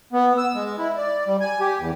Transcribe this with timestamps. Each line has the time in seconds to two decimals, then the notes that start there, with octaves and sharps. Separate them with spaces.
0.13 B3
0.38 E6
0.55 G#3
0.78 E4
0.97 D5
1.27 G3
1.41 G#5
1.60 G4
1.79 E2